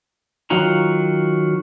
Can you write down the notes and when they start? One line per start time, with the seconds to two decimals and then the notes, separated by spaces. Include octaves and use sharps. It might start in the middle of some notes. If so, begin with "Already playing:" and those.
0.50 D#3 F#3 F4 F#4 A#5